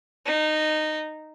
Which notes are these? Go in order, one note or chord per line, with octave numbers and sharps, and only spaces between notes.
D#4